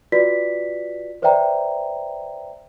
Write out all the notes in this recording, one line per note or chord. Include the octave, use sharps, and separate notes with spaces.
F4 F#4 B4 D5 B6
B4 C5 D5 E5 G5 A#5